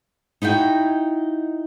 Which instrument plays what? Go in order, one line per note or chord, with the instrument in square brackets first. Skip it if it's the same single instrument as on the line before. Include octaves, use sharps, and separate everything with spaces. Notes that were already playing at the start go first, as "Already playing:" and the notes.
[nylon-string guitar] D#4 E4 F#4 G5